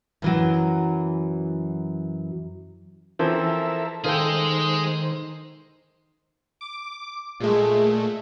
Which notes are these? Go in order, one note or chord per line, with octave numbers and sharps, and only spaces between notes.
F#2 E3 F#3
E3 F3 C4 A4 A#4 E5
D#3 G#3 D#4 G#4 A4 C5 F5 G5
D6
A#2 G#3 A3